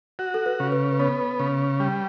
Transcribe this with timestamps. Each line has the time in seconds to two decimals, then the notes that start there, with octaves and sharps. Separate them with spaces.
0.19 F#4
0.34 A4
0.46 B4
0.60 C#3
0.72 B4
0.92 B4
0.99 B3 C#5
1.39 C#3
1.80 G3